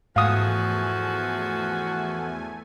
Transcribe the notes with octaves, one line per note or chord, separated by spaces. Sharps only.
E2 G#2 F3 A3 F#4 F5 G#5 D#6